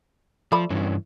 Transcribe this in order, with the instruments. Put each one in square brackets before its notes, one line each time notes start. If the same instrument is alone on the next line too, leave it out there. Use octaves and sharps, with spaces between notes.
[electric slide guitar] F3 [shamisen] A3 D5 B5
[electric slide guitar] G2 E3 C#4